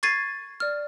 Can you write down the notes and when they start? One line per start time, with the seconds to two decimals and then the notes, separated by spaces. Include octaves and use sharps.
0.03 C#6 G#6 A6 C7 D#7
0.60 D5 F6